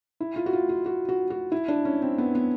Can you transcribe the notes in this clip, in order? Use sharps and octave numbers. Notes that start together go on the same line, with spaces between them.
E4
F4
F#4
F4
F4
F#4
F#4
F#4
E4
D4
C#4
C4
B3
B3